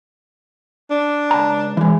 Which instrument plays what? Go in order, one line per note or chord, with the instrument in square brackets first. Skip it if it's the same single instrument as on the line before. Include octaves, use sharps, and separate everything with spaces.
[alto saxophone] D4
[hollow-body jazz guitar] C#2 A5 A#5
E3 G#3